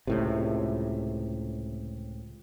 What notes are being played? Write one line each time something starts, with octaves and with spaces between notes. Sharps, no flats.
C#2 A2 C3